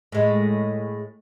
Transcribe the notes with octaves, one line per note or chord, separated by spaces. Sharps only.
A2 G#3